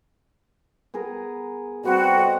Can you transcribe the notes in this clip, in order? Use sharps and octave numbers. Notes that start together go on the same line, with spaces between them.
B3 G#4 A#4
G3 B3 C4 F#4
A4 D#5